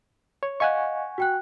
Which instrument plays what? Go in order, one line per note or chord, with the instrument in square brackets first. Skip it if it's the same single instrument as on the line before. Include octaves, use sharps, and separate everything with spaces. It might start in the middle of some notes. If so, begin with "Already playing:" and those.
[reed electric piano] C#5
[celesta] D#5 F5 [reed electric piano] F#5 G#5 C#6
[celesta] F#4 G5 F#6